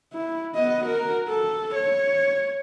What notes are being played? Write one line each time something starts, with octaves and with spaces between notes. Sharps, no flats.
E4
B3 D#5
F#4 A#4
A4
C#5